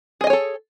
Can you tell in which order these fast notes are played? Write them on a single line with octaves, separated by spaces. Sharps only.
G#4 D#5 G#5 C#5 A4